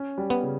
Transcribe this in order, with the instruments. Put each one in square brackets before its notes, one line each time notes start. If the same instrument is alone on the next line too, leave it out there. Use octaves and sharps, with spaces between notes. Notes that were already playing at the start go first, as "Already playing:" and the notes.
Already playing: [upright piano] C#4
G3
[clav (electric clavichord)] B3
[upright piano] C#3